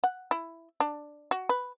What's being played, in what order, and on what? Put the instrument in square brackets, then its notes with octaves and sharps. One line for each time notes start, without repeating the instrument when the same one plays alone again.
[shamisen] F#5
E4
D4
F#4
B4